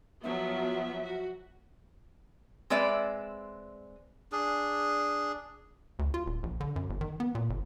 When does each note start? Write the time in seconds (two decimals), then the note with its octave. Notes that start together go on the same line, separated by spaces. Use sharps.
0.23 F3 F#3 B3 E5
1.03 F#4
2.70 G#3 C4 B4 D5 E5
4.32 D4 G#4
5.99 D2
6.14 F4
6.26 D#1
6.43 A#1
6.60 D3
6.76 F#2
6.90 G1
7.01 D#3
7.20 B3
7.35 A#2
7.50 G1